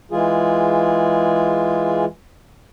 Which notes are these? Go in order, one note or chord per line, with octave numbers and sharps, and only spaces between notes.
E3 G#3 F4 G#4